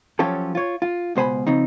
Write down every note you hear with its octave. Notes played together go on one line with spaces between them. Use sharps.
F3 F#3 C#4 F4 G4 A4
F4 C#5
F4
C#2 B2 C5 G#5 B5
C#3 F3 C4 D#4